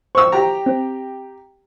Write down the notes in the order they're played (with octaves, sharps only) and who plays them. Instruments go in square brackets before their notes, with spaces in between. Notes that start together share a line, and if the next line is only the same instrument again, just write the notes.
[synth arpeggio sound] C5 [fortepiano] C#6 E6
[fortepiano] G4 A#5
[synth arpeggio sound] C4